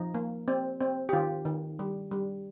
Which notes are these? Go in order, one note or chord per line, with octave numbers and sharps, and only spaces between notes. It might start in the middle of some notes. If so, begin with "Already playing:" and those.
Already playing: F3 D#4
A#3
C4
C4
G4
D#3 F4
D#3
G3
G3